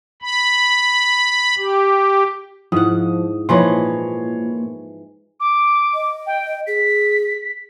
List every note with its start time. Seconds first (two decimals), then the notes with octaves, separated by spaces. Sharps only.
0.22 B5
1.58 G4
2.72 G#2 F3 E4 F#5 D#6
3.49 A#2 E3 F3 D#4 C#5 B5 C6
5.40 D6
5.94 D#5
6.26 G5
6.67 G#4 B6